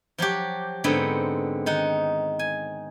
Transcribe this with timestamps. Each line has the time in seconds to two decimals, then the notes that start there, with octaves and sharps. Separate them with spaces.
0.18 F3 F#3 F#4 G4
0.84 G#2 D3 B3 C4
1.66 D#3 D#4 F#5
2.39 G#5